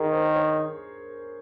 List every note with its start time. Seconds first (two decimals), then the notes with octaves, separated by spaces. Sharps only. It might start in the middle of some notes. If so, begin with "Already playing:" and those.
Already playing: D#3 G#4 A#4
0.12 C5
0.35 C#5